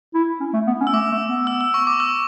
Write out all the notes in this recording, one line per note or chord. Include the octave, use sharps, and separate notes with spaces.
E4
C#4
A3
B3
C#4
E6
A3 D6
A3
B3
E6
E6
C#6
D6
E6